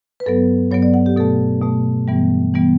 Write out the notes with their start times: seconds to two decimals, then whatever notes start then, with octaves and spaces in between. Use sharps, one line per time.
0.20 B4
0.26 G2 F#3 B3 A4
0.71 G2 F#3 B3 C#5
0.82 D5
0.94 F#5
1.06 G4
1.16 B2 A3 A4
1.62 B2 A3
2.08 G2 E3 G3 B3
2.54 E3 G3 B3